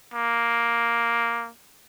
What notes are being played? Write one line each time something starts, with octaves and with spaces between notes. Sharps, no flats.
A#3